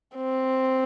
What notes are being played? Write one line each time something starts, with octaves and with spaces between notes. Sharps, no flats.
C4